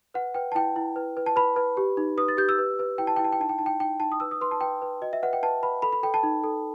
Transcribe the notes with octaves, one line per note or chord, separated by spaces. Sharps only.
B4 F#5
B4 G5
A5
E4 G5
E4
B4
B4
A5
B4 B5
B4
G4
D#4
B4 D#6
A6
G4 G6
E6
B4
B4
E4 G5
A5
E4 G5
A5
G5
D#4 A5
G5
D#4 A5
G5
D#4 G5
D#4 A5
D#6
B4 E6
D#6
B4 C6
A5
B4 G5
B4
F#4 D#5
E5
B4 F#5
G5
B4 A5
B4 B5
A4 B5
B5
A4 G5
A5
D#4
A4